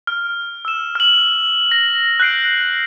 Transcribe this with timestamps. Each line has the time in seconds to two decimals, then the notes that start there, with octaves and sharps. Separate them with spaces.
0.07 F6
0.65 E6 E7
0.95 F6 F#7
1.72 A#6
2.20 F#6 G6 C7 D7